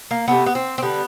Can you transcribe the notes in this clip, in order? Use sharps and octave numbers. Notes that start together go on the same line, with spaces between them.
A#3
C3 F3 A3 B3
B3
C4
C4
D3 G3 B3